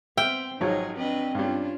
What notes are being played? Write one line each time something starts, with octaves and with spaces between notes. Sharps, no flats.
B3 C4 E5 G5 F6
G#1 F3 F#3 D#4 G#4 C#5
C4 D4 B4 D#5
G2 G3 C#4 D4 F4